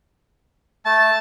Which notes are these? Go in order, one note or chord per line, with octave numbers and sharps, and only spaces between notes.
A3 A5